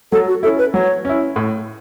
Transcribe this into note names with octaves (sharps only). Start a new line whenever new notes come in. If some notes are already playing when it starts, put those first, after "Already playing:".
F#3 A4
F#4
C#4 E4 A4
B4
F#3 C#5
C#4 E4
A2